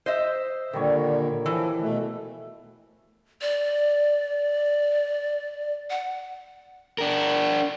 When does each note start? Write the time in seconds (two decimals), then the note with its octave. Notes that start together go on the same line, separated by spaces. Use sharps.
0.06 C5 D#5 E5
0.73 A#2 D3 D#3 G3 C#5
1.46 E3 F3
1.81 B2 A3
3.42 D5
5.90 F#5
6.98 D4 A#4